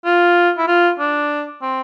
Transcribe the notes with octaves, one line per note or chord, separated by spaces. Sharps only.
F4
E4
F4
D4
C4